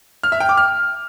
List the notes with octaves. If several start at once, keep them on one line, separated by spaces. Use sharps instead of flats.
F6
E5
G5
D6
F6